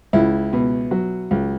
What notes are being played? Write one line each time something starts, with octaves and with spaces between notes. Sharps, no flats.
C#2 E4
B2
F#3
C#2